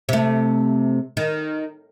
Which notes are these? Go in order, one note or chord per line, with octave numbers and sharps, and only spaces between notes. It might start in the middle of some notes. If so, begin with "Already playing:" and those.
C3 A3
D#3